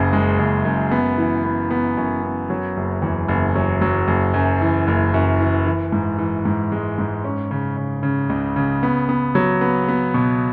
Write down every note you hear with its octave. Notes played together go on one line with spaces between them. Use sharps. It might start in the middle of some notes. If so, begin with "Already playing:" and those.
Already playing: F#1 F#2 C#3
G#3
F#1
F#2
B3
E3
B3
B3
F#2
B3
F#3
F#1
E2
F#1
F#3
F#3
F#1
F#2
E3
F#1
F#2
E3
E3
G#2
E3
G#2
G#3
G#2
C#4
C#3
C#3
C#3
C#2
C#3
B3
B3
F#3
B3
B3
B2